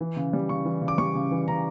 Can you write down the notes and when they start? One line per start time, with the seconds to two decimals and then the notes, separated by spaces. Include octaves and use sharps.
0.01 E3
0.16 C#3
0.33 G3
0.49 C#3 C#6
0.65 E3
0.81 C#3
0.88 D6
0.98 G3 C#6
1.15 C#3
1.31 E3
1.48 C#3 A#5